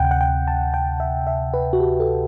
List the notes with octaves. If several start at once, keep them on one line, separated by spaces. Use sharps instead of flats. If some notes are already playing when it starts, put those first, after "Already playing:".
Already playing: D2 C3 F#5 G5
F#5
G5
A5
G5
E5
E5
B4
F#4
G4
A4